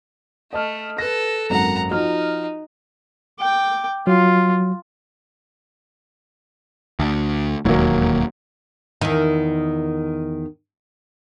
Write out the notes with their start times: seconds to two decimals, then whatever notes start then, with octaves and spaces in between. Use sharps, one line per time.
0.53 A3 D#5 A5 F6
0.98 A4 B4 F#6 A#6
1.50 G#1 F#2 A#3 F#5 A#5
1.91 F3 D#4 F#4 F6
3.40 G5 D6
4.07 F#3 F4
6.99 D2
7.65 E1 D#2 F#3 A#3
9.01 E2 D#3